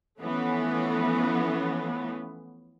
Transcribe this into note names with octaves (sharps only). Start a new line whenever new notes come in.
E3 F3 A3 B3 C#4